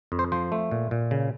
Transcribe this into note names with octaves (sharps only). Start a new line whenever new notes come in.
F2
C5
F3 C5
A3
A#2
A#2
C#3